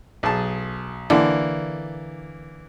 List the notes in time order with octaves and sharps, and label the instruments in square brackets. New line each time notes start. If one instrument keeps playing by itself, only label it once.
[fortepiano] B1 G#4 A5
[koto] D3 [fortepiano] E3 A#3 D5